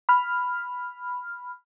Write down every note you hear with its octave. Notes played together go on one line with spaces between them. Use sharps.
B5 F6